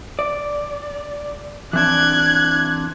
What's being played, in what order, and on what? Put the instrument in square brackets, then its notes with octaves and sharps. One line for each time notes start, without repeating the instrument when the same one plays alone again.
[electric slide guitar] D5
[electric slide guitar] E3 C4 D4 [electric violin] F#6 G#6